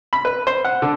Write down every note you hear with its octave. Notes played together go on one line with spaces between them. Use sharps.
B5
B4
C5
F#5
D3